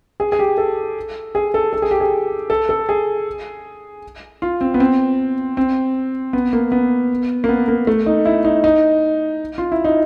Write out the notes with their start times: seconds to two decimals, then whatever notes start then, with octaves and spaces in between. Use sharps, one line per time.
0.20 G#4
0.32 G#4
0.39 G4
0.58 A4
1.35 G#4
1.54 A4
1.73 A4
1.82 G#4
1.91 G4
2.00 G#4
2.50 A4
2.69 A4
2.89 G#4
4.42 F4
4.61 C4
4.74 B3
4.80 C4
5.57 C4
6.33 B3
6.53 A#3
6.72 B3
7.44 A#3
7.49 B3
7.68 A#3
7.87 A3
8.06 D#4
8.25 E4
8.44 D#4
8.64 D#4
9.58 F4
9.72 E4
9.84 D#4